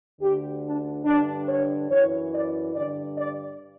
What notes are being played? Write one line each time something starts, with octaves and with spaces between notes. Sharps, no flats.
D2 D3 G4
D4
G2 D3 D4
C#5
F#2 E3 C#5
D5
G2 D3 D5
D5